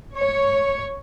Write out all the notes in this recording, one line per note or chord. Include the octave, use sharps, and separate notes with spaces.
C#5